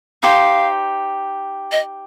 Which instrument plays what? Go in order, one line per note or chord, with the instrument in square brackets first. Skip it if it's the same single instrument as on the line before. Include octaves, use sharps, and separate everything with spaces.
[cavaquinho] D#4 G4 C5 [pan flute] F5
[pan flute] D#5